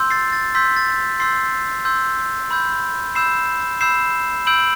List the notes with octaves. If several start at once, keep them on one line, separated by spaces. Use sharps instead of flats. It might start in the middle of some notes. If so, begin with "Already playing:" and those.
Already playing: C6 E6 G6
A6 C7
A6
C6 E6 G6 B6
A6
C6 E6 G6 A6 C7
C6 E6 G6
B5 E6 G6
B5 E6 G6 C7 E7
B5 E6 G6 C7 E7
B5 E6 G6 D7 F#7